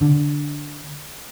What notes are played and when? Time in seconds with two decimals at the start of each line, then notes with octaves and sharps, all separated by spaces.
0.01 D3